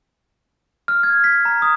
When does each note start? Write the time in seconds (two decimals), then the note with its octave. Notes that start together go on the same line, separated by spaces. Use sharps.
0.88 F6
1.03 G#6
1.24 B6
1.45 A#5
1.62 D#6